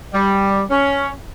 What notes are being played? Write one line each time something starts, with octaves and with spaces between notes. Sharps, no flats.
G3
C#4